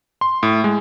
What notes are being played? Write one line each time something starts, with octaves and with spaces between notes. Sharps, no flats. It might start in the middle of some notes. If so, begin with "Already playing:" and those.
C6
A2
G#3